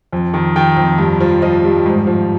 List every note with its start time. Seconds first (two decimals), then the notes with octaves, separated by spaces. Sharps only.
0.13 F2
0.34 D#3
0.56 D#3 G5
0.77 F2
0.98 G2
1.20 F3
1.42 F3 D#5
1.64 G2
1.86 G#2
2.07 F3